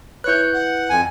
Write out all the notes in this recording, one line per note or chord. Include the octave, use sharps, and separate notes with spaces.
E4 B4 C#5 F#6 G6
F#5
F2 G#5